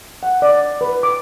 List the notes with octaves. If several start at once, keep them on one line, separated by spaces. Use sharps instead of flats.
F#5
D5
B4
D6